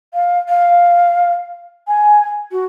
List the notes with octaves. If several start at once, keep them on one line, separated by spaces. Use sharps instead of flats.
F5
F5
G#5
F#4